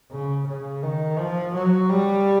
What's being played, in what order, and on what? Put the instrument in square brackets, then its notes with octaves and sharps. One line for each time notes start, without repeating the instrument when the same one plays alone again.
[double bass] C#3
C#3
D#3
F3
F#3
G3